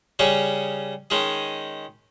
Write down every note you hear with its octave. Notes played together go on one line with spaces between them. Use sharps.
C#3 G3 C#4 G#4 C#5
D#3 G#3 C#4 G#4